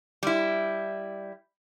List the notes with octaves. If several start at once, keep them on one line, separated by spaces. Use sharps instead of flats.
G3 E4